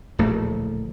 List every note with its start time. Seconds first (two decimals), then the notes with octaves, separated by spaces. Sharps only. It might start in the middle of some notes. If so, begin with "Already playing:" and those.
0.19 D1 A#1 A2 A3